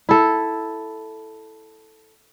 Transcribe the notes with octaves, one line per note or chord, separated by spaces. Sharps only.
E4 A4